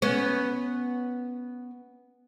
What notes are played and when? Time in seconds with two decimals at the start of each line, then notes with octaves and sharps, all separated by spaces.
0.02 B3 C#4